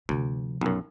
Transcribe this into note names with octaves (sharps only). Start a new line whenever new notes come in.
D2 C3 F3
B1 F#2